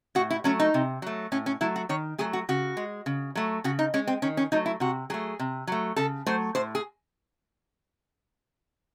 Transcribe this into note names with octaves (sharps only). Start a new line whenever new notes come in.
A2 F#4
E4
F#3 A3 C#4
D#4
C3
F#3 A3
A2 C#4
C#4
F#3 A3 E4
F#4
D#3 C#5
F#3 A3 G#4
F#4
C#3 F#4
G#3
C#3
F#3 A3
C#3 F#4
D#4
G#3 C#4
C4
D#3 C#4
C#4
F#3 A3 D#4
E4
C3 F#4
F#3 A3 G#4
C3
F#3 A3
C#3 A4
F#3 A3 C5
A2 C5
G#4